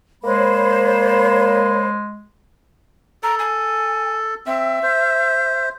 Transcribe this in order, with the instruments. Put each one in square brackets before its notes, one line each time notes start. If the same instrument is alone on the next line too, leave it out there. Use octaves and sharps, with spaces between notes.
[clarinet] G#3 [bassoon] A#3 [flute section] C5 C#5 B5
[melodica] A4 [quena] A#5
[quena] G#5
[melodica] C4 [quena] E5
[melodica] C5